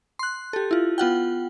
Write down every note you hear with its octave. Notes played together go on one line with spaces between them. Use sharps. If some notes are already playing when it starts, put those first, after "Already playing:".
C6 F#6
G4 A4
E4 F4
B3 F4 F#5 G5